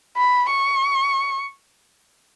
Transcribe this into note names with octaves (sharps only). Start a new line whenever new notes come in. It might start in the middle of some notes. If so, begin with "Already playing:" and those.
B5
C#6